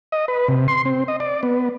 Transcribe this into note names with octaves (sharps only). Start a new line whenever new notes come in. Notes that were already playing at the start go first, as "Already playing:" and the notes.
D#5
B4
C3
C6
C4
D#5
D5
B3